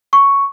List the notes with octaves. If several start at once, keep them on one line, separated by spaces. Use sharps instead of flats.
C#6